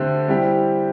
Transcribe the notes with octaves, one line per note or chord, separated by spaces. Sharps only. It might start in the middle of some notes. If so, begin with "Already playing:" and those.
Already playing: D3 A3 C4 G4
G3 C4 E4 G4